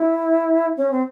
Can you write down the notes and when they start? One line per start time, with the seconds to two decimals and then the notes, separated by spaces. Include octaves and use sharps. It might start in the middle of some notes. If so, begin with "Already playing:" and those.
Already playing: E4
0.77 C#4
0.91 C4